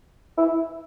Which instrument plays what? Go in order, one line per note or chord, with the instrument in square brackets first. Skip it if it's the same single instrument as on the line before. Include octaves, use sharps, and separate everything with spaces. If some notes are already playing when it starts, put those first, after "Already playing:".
[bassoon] E4